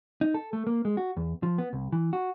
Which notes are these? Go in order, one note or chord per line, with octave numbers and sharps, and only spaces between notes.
D#4
A4
A3
A#3
G#3
F#4
E2
F3
B3
C2
E3
F#4